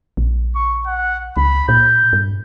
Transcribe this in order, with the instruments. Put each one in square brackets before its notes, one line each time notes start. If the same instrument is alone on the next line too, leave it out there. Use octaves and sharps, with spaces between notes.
[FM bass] A#1
[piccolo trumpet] C#6
F#5
[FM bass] C#2 [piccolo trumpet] B5
[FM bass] A#2 [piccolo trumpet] G6
[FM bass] G2